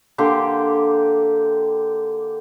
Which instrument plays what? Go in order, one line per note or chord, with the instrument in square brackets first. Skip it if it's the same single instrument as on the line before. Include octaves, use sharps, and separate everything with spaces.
[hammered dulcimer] D3 A#3 G4 C6